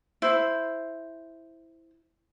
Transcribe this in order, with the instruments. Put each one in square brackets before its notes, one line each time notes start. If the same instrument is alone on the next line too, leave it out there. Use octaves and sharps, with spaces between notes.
[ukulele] E4 C5